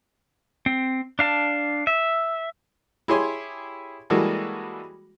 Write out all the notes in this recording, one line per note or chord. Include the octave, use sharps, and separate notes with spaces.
C4
D4 F5 A5
E5
E4 G4 G#4 C#5 G#5 C6
E3 G3 G#3 A#3 F#4 A4